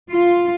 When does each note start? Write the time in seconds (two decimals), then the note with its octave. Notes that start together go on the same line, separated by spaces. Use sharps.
0.10 F4